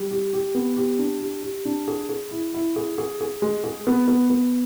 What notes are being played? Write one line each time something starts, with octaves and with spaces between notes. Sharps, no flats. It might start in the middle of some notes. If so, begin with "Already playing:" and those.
Already playing: G3
G4
G4
B3
G4
D4
G4
G4
D4
G#4
G#4
E4
E4
G#4
G#4
G#4
G#3
G#4
B3
B3
B3